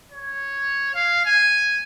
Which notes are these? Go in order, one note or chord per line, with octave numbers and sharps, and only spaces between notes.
C#5
F5
G#5